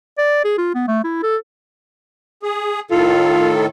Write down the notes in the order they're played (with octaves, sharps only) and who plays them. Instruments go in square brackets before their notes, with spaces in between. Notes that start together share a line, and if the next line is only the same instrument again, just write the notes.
[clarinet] D5
G#4
F4
B3
A3
E4
A4
[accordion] G#4
[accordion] A2 D#3 A4 [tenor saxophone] F4